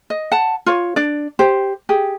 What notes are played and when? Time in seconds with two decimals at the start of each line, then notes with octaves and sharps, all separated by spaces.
0.10 D#5
0.32 F#5 A5
0.66 F4 C#5
0.96 D4 D5
1.39 G4 C5
1.89 G4 G#4